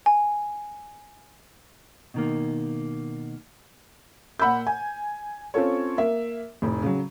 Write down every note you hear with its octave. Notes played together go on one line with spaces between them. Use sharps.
G#5
B2 D#3 A#3
A#2 F#5 B5 E6 G6
G#5
C4 C#4 F4 A4 C#5
A#3 E5
F1 A2
C#3 F#3